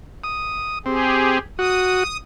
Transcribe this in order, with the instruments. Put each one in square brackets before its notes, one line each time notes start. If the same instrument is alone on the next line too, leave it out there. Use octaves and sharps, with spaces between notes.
[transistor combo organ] D#6
[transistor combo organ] C4 [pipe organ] G4 G#4
[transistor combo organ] F#4 [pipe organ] D#6